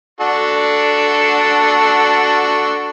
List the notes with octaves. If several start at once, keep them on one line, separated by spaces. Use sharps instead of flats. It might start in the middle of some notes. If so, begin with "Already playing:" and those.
D4 F#4 A4